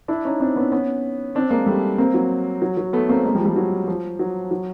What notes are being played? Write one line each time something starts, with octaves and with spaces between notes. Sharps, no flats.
D4 E4
C#4 D#4
C4 D4
B3 C#4
B3 C#4
C4 D4
G#3 A#3
G3 A3
A#3 C4
F#3
F#3
F#3
A3 B3
A#3 C4
G#3 A#3
F3 G3
F3 G3
F#3
F3
F#3
F#3